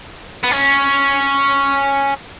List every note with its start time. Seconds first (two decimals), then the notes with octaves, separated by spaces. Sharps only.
0.43 B3
0.51 C#4